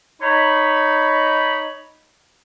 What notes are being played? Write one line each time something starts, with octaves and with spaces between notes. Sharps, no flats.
D#4 C#5 B5